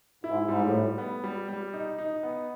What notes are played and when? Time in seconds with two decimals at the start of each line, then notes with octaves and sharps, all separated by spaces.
0.24 G#2 E4
0.43 G#2
0.48 G3
0.60 A2
0.73 G3
0.98 B3
1.24 G3
1.48 G3
1.73 D#4
1.99 D#4
2.23 B3